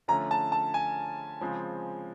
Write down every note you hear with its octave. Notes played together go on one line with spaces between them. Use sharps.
D3 F3 A3 C#4 A#5
A5
A5
G#5
C#3 F3 G#3 C4